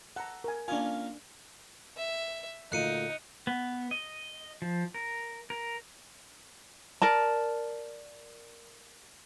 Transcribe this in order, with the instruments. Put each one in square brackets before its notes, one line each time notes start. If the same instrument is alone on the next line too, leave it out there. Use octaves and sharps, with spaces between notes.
[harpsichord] A4 [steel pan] F#5 A#5
[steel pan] A#4 G#5
[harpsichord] A#3 C#4 F4 [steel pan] D4 G#5
[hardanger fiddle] E5
[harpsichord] D2 A#2 [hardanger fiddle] D#4 [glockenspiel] F#6 C#7 D#7
[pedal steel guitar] B3
D#5
F3
A#4
A#4
[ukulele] A#4 D5 A5